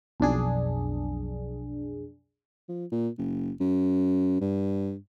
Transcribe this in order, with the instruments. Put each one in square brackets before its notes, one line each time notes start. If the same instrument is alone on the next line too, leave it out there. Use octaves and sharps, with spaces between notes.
[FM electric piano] B1 F2 D4 G#4
[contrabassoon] F3
A#2
F#1
F#2
G2